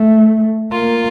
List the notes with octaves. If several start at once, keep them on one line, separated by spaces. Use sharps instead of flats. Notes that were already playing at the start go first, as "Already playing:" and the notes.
Already playing: A3
A#3 F4